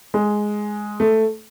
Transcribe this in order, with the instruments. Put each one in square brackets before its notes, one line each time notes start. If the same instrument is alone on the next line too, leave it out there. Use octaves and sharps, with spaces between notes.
[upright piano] G#3
A3